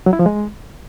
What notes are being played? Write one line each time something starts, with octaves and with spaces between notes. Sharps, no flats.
F#3
E4
F3
G#3